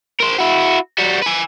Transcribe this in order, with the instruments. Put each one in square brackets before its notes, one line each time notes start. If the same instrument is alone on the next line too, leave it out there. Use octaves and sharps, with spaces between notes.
[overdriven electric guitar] A#4 C5
E4 F#4
G3 F#4
B4 G#5